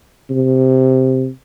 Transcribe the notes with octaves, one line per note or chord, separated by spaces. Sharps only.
C3